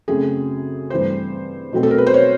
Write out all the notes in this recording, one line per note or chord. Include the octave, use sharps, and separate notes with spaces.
F#2 C#3 F#3 A3 C4 G#4
G2 E3 A3 C4 C5
B2 F#3 A3 C4
A4
A#4
B4
C5
C#5